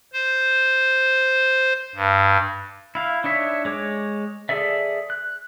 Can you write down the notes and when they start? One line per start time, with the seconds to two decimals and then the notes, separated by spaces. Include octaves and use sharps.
0.13 C5
1.95 G2
2.95 E4 F5
3.24 D4 D#4 C#5 E5
3.65 G#3 C#5 D6
4.49 G#4 A4 D5 E5
5.10 F#6